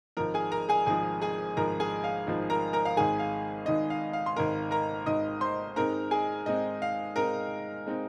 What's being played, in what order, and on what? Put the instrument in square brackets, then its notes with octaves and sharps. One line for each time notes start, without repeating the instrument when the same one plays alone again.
[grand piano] G#1 G#2 F3 A#4 A#5
G#4 G#5
A#4 A#5
G#4 G#5
G#1 G#2 F3 G#4 G#5
G#4 G#5
G#1 G#2 F3 A#4 A#5
G#4 G#5
F5
G#1 G#2 F3
A#4 A#5
A#4 A#5
F5
G#1 G#2 D#3 G#4 G#5
F5
G#1 G#2 D#3 D#5
F5
F5
C6
G#1 G#2 D#3 A#4 A#5
A#4 A#5
G#1 G#2 D#3 D#5 D#6
C5 C6
G#2 G#3 C4 D#4 A#4 A#5
G#4 G#5
G#2 G#3 C4 D#4 D#5
F5
G#2 G#3 C4 D#4 A#4 A#5
G#3 C4 D#4